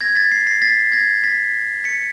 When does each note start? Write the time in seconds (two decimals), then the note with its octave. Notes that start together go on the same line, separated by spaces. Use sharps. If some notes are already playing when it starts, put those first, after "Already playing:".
0.01 G#6 A#6
0.15 A6 B6
0.31 A#6 C7
0.47 A#6 C7
0.62 A6 B6
0.92 G#6 A#6
1.24 A6 B6
1.84 B6 C#7